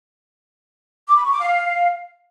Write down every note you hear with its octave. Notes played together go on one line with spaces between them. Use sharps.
D6
B5
C#6
D6
F5